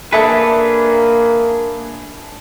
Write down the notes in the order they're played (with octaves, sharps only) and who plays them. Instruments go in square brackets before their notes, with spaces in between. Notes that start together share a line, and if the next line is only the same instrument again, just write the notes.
[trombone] A#3 [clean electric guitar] D4 G#4 B4 [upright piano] A4 E5 A5